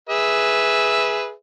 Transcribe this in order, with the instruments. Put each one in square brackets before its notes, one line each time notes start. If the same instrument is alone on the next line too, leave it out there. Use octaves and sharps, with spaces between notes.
[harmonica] G#4 B4 E5